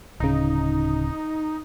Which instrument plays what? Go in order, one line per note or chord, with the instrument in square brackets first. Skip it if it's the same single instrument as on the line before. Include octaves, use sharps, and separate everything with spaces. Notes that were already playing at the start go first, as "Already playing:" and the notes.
[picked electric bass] D1 C#3 [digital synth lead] D#4